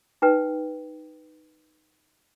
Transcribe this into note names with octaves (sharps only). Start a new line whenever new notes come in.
D#4 B4 G5